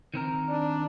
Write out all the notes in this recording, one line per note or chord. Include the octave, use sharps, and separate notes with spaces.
D#3 C4 A#4
D4